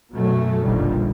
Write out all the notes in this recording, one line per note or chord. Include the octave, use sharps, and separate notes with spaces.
F#2 B2 F#3 A3
F1 A#1 F2 D3 D#3 G3